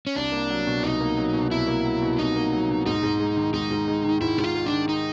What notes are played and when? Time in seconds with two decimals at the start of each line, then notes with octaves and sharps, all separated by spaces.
0.07 C#4
0.16 C2 D4
0.32 A#3
0.50 F#3
0.67 B2
0.83 C2 D#4
1.01 A#3
1.17 F#3
1.33 B2
1.51 C2 E4
1.67 A#3
1.85 F#3
2.02 B2
2.18 C2 D#4
2.36 A#3
2.53 F#3
2.69 B2
2.86 G#2 D#4
3.03 G#2
3.20 G#3
3.37 D#3
3.53 G#2 D#4
3.70 G#2
3.88 G#3
4.04 D#3
4.21 G#2 E4
4.38 G#2 F#4
4.44 F4
4.55 G#3
4.66 D4
4.72 D#3
4.89 D#4